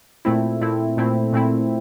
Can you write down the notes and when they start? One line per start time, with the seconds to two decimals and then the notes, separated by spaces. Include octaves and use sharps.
0.25 A#2 A3 C4 E4
0.61 A#2 A3 C4 E4
0.97 A#2 A3 C4 E4
1.33 A#2 A3 C4 E4